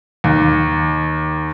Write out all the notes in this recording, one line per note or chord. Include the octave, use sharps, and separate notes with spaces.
D#2